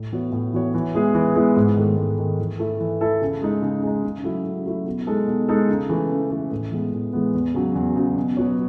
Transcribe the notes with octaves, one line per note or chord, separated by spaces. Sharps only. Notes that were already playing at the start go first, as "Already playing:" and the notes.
Already playing: A2
E3 B3 F#4 C#5
A2
E3 B3 F#4 C#5
E3
G#3 B3 E4 G#4
E3
G#3 B3 E4 G#4
G#2
D#3 A3
G#2
D#3 A3
E3
A3 E4 A4
E3
A3 E4 A4
C#3
G#3 D#4
C#3
G#3 D#4
C#3
F#3 A3 E4
C#3
F#3 A3 E4
B2
G#3 D#4 A4
B2
G#3 D#4 A4
C#3
E3 A3
C#3
E3 A3
A2
E3 G#3 B3
A2
E3 G#3 B3
E2
C#3 F#3
E2
C#3 F#3
B2
F#3 B3 F#4 C#5